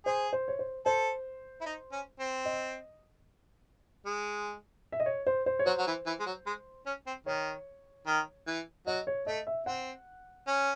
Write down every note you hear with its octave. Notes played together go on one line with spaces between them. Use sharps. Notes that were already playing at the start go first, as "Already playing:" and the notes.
G#4 C5
C5
C#5
C5
A4 C5
E4
D#4
C#4
C4
D#5
G#3
E5
D#5
C#5
C5
C5
C#5
F#3 C5
F#3
E3
E3
G#3
F#3
G#3
C#4
C4
D#3 C#5
D#3
E3
F#3 D#5
C#5
A3 D#5
E5
C4 F#5
C#4